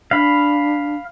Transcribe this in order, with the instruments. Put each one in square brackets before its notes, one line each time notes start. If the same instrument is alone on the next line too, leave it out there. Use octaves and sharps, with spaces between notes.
[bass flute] D4 [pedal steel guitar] F5 B5